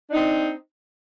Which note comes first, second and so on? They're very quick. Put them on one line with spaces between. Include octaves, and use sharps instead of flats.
D4 D#4 C4